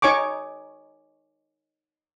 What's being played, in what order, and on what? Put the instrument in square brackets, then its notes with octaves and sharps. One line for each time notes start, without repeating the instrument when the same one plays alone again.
[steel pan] D#4 C#5 G#5 C#6 D6